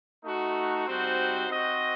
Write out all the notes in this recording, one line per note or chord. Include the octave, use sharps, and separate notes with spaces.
A3 D#4 F#4
G3 C4 D#4 F#4 C5
C4 F#4 D#5